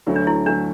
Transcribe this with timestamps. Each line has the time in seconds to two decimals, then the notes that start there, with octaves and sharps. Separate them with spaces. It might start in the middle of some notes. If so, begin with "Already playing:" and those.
0.07 D2 D3 F#3 A3
0.16 D4
0.27 E4
0.46 D3 F#3 A3 D4